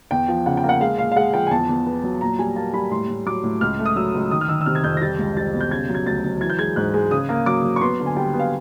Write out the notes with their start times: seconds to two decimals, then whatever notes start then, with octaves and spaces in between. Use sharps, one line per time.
0.11 E2 G5
0.28 F3
0.46 C#3 F#5
0.57 G5
0.64 A#3
0.69 F#5
0.80 G#3 F5
0.98 A#2 F5
1.12 F5
1.16 G#3 F#5
1.33 F3 G5
1.47 G#5
1.51 E2 A5
1.69 E2
1.86 B3
2.03 F#3
2.21 A#2 A#5
2.39 G3 G#5
2.56 A#3 A5
2.74 G3 B5
2.91 A2 C6
3.08 A2
3.26 F#3 D6
3.43 A2
3.61 C#2 F6
3.79 A3
3.86 D#6
3.96 F#3 E6
4.14 C#2
4.31 D#3 D#6
4.41 F6
4.49 D#3 E6
4.61 E6
4.66 C3 F6
4.75 G#6
4.83 F2 G6
4.97 A#6
5.01 G3 A6
5.19 C#2
5.36 G3 A6
5.54 B2
5.61 G6
5.71 C#3 G#6
5.89 F#3
5.95 G#6
6.06 D2 A6
6.24 F#3
6.41 E3 G#6
6.50 G6
6.59 G#3 G#6
6.76 G#2 F#6
6.94 G#3
7.11 C#3 D#6
7.29 A#3
7.46 F#3 D6
7.64 F#3
7.76 C#6
7.81 B3 C6
8.00 D3
8.06 G#5
8.16 G3 G5
8.34 B3
8.39 F5